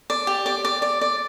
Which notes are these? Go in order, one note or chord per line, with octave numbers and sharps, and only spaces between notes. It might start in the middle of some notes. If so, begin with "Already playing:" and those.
D5
G4
D5
D5
D5
D5